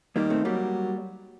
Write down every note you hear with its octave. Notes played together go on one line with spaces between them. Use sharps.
D#3 G3 A#3
A3 C4
F#3 G3 A#3